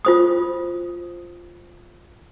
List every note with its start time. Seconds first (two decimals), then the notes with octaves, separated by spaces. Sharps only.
0.05 F4 C5 D#6